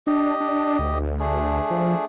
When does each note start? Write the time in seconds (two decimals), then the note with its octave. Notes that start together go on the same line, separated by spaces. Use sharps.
0.07 D4 G4 D#5
0.40 D4
0.79 D2
1.20 A3 D4 G#4
1.71 F3